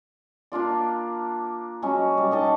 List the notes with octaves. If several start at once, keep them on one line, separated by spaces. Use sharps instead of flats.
A#3 D4 F4 D5
F#3 G#3 C#4
G3
D4 D#4 D#5 A5